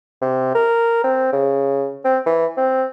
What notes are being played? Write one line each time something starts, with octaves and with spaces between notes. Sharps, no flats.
C3
A#4
C4
C#3
C4
E3
C4